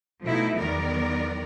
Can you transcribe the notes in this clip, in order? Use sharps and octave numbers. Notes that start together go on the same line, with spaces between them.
B2 F3 A3 D#4 E4
E2 D#3 F#3 B3 A#4 D5